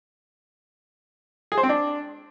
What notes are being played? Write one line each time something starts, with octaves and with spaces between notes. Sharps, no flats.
G#4
C5
C4
D4